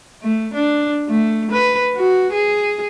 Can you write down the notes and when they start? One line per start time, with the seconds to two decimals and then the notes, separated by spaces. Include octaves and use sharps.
0.22 A3
0.54 D4
1.09 A3
1.52 B4
1.96 F#4
2.33 G#4